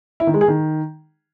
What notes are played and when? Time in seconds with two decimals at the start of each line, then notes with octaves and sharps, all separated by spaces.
0.20 E4
0.27 D#3
0.34 G#3
0.41 G#4
0.48 D#3